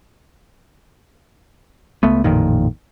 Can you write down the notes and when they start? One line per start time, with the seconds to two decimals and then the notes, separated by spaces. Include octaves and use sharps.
2.03 C#2 A3 B3
2.24 A1 F2 A#2 D#3